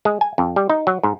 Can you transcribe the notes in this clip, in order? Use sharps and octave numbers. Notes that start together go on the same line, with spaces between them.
G#3
G#5
F2
G3
D#4
F#3
G#2